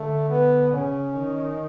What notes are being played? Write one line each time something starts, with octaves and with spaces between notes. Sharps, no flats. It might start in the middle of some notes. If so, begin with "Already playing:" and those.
Already playing: D3 A3
B3
C#3 C#4
D#3